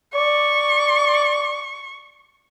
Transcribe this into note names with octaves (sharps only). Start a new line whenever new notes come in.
D5 C#6